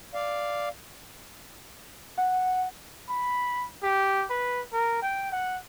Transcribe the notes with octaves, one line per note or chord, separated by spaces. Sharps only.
D5 F5
F#5
B5
G4
B4
A#4
G5
F#5